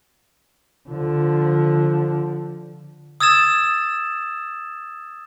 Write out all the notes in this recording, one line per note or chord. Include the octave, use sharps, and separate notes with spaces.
D3 F3
D#6 E6 G#6 A6 E7